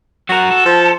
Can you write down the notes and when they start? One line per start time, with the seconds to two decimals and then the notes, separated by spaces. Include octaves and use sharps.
0.29 F#3 F#4 A#4
0.51 A4
0.65 F3